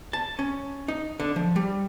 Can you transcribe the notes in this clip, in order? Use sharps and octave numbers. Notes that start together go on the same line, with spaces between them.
A5
C#4
D#4
D3
F3
G3